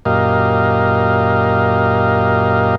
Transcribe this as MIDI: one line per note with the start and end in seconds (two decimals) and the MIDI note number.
0.05 2.75 42
0.05 2.75 46
0.05 2.75 67
0.05 2.75 70
0.05 2.75 75
0.05 2.75 77